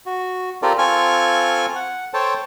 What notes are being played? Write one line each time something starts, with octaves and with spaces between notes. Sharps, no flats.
F#4
C4 F4 G4 A4 A#4 D5
C4 F4 A4 G#5 C#6 F6
F#5
A4 C5 C#5 G5 A5